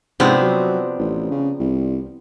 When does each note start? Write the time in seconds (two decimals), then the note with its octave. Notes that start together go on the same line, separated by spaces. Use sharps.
0.20 G#2 C3 F3 B3 C4 D4
0.42 F#3
0.99 A1
1.31 C#3
1.60 C2